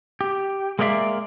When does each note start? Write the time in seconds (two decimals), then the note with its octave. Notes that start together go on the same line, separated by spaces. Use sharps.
0.21 G4
0.79 G#3 A#3 A#4 D5 E5 F5